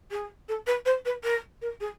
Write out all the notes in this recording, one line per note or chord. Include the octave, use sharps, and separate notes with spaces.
G#4
A4
B4
C5
B4
A#4
A#4
G#4